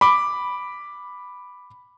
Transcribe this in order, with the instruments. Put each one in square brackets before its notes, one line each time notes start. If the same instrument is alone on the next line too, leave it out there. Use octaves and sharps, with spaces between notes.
[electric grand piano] B5 D6